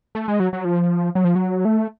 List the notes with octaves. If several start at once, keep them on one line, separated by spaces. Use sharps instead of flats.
A3
G#3
F#3
F#3
F3
F#3
F3
F#3
A3